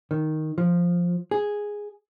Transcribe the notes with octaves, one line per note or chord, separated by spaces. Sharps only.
D#3
F3
G#4